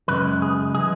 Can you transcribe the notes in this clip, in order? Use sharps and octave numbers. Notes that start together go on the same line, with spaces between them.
F#2 C#3 G#3 B4
G#4
E3 G#3 G#4